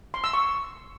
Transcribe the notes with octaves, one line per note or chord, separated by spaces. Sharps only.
C6
E6
C#6